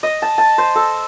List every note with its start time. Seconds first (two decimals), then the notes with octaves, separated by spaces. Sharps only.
0.03 D#5
0.22 A5
0.38 A5
0.58 C5
0.75 A4